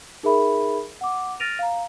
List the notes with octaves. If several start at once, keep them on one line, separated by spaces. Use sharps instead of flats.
D#4 G#4 A#4 E5 B5
F#5 D6
F6 A6 A#6 D7 D#7 F7
F5 A#5